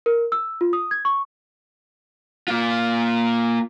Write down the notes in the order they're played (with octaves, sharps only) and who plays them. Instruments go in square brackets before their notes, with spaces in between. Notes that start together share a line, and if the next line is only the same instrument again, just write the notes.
[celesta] A#4
E6
F4
D#6
G#6
C#6
[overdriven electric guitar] A#3 F4